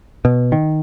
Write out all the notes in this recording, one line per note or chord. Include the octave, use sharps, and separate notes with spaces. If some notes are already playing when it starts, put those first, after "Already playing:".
B2
D#3